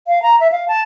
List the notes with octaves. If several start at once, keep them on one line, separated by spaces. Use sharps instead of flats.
F5
A#5
E5
F5
A5